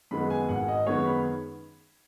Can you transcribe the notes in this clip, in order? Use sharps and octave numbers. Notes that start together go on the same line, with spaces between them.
F#2 D#3 G#3 B3 B5
G#5
G#1 F#5
D#5
F#2 D#3 G#3 B3 C#5
B5